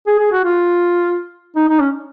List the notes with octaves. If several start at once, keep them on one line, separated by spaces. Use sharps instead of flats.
G#4
G#4
F#4
F4
D#4
D#4
C#4